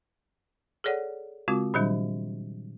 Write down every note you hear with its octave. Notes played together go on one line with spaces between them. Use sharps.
G#4 A4 C#5 D5 F#5
C#3 G#3 C4 F4 F#4
A#2 D#3 F#3 G3 D4